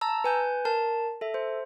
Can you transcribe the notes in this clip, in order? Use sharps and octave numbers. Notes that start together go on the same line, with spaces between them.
A5 A#5 E6
B4 G#5 G6
A#4 A5
A4 E5
C5